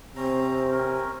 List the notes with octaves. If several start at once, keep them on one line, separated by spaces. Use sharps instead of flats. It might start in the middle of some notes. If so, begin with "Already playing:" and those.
C3 C4 C#4 A#5
C#4 A#4